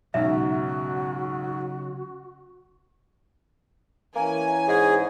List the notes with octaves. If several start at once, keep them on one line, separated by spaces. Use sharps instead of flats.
B1 G#2 C#3 F#3 F#4 E5
E3 A#3 C#4 G#5
G#2 G#4